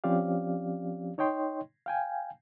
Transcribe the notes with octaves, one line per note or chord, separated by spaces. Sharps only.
F3 C4 C#4 G4 D5 F5
D#4 C#5 D#5 G5 C6
F5 G5 G#5